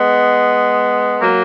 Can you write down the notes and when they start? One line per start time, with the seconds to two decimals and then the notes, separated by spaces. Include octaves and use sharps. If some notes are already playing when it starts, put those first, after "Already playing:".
Already playing: G#3 B3
1.19 F#3 A#3